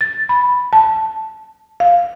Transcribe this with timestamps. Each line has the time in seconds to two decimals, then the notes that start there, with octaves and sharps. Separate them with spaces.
0.01 A6
0.29 B5
0.73 A5
1.80 F5